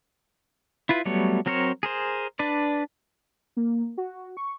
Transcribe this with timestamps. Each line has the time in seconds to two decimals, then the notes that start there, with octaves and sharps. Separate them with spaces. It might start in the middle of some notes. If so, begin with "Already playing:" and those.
0.89 E4 F4 B4
1.05 F#3 G3 A3 B3 C#5
1.46 F#3 C4 A#4 C5 C#5
1.83 G#4 A#4 C5
2.39 D4 B4 D5
3.57 A#3
3.98 F#4
4.37 C#6